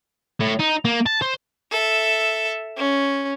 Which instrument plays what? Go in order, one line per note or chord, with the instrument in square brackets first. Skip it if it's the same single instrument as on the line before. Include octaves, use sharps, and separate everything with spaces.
[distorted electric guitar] A2
D#4
A#3
A5
C5
[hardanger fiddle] A4 E5
C#4